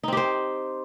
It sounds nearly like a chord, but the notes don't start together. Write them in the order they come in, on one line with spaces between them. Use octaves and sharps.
D#4 C4 G4 C5